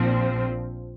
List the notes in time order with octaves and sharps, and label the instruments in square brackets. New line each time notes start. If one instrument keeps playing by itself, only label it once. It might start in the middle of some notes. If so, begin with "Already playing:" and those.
Already playing: [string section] A#1 A#2 F3 C4